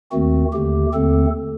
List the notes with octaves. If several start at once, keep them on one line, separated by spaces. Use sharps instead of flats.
D#2 D#3 A3 C4 F#4
D#2 D3 A3 G4
D#2 D3 A3 C4 A4